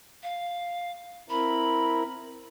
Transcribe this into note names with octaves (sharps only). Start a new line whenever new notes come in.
F5
C4 E4 A#4 B5